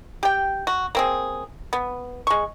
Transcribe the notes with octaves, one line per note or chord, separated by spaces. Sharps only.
G4 G5
F#4
A#3 C4 G#4
B3
G#3 C#6